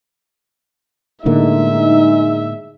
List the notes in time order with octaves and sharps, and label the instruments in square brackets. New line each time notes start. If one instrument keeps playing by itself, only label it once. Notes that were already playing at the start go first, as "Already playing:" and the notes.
[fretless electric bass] A2 D3 A#3 [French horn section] G#3 D#4 [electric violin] E5